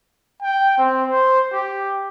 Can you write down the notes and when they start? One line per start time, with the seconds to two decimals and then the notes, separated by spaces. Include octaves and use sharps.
0.43 G5
0.78 C4
1.08 C5
1.52 G4